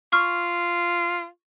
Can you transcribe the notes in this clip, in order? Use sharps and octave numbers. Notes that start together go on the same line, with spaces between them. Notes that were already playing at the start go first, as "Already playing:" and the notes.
F4 C#6 F6